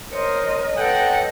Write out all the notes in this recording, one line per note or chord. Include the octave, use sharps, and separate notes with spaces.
A#4 C5 C#5 D#5
A4 B4 D#5 F#5 G5